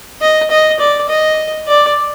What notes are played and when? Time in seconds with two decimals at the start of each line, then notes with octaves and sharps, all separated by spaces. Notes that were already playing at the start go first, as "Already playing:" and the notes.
0.21 D#5
0.51 D#5
0.79 D5
1.08 D#5
1.67 D5